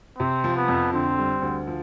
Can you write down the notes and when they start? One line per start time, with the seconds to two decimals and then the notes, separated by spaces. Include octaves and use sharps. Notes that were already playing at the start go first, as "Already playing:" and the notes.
0.19 C3 C4
0.44 F3
0.56 B3
0.68 F2
0.93 D3 C4
1.18 G3
1.42 D2
1.67 F3